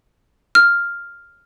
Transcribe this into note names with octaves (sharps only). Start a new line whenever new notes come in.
F6